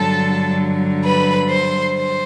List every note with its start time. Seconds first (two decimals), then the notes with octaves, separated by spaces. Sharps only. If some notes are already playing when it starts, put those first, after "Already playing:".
Already playing: G2 D3 F#3 A4 A5
1.04 B4 B5
1.49 C5 C6
1.93 C5 C6